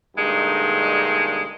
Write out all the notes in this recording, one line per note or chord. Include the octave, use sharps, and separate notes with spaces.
G2 A#2 D3 G#3 D#4